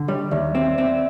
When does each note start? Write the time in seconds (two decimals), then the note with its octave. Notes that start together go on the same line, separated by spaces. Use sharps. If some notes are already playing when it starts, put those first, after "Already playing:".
Already playing: D3
0.08 G3 C#5 D#5
0.31 D#2 D5 E5
0.55 C4 D5 E5
0.78 C4 D5 E5